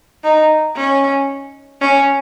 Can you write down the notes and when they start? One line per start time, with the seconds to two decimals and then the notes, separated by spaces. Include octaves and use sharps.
0.24 D#4
0.76 C#4
1.81 C#4